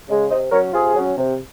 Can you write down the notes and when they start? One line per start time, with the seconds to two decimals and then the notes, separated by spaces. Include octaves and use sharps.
0.09 C#3 G#3
0.30 C3 C5 D#5
0.51 F#3 C#4 A#4 C#5
0.73 C3 F4 G#4
0.95 F#3 C#4
1.17 C3